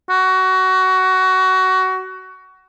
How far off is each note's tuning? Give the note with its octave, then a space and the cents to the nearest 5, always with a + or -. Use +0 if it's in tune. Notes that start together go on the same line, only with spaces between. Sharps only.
F#4 +20